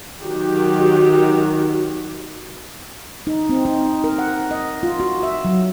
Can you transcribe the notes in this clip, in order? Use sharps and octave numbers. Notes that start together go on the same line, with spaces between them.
D#3 F#3 F#4 G4
D#4
C4
D#4
A#4
F#5
D#5
F4
F#4
E5
F#3